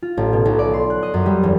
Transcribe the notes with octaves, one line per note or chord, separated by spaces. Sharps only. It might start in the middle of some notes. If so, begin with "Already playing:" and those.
F4
A1
B2
B1
D5
C6
F#6
D#5
F#2
G3
E1